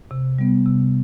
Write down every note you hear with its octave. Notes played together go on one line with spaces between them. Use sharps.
C3
G3 B3
C3